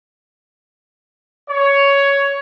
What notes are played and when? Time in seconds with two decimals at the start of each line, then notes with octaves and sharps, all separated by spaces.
1.51 C#5